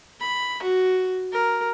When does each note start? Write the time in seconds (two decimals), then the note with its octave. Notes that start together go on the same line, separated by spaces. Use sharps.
0.21 B5
0.63 F#4
1.33 A#4